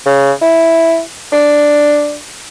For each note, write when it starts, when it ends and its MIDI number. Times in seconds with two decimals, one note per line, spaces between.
0.06 0.32 49
0.42 1.01 64
1.32 2.16 62